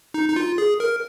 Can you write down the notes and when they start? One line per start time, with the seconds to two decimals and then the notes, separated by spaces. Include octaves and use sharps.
0.14 D#4
0.29 D#4
0.36 F4
0.58 G#4
0.80 A#4